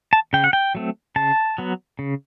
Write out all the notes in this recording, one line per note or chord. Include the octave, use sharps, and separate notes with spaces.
A5
C#3 G5
F#5
G5
F#3 A3 C4
C#3 A5
F#3 B3
C#3